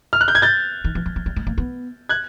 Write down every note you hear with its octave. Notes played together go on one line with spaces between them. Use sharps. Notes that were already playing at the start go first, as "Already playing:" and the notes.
F6
F#6
G6
G#6
G6 A6
D#3
E3
F3
F#3
G3
G#3
A#3
B3
F#6 G#6